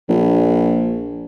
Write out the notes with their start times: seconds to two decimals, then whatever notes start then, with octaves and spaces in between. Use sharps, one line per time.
0.09 A#1